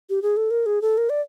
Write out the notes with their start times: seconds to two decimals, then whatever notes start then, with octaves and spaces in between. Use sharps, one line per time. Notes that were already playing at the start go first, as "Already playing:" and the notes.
0.10 G4
0.22 G#4
0.37 A4
0.51 A#4
0.66 G#4
0.82 A4
0.98 A#4
1.10 D5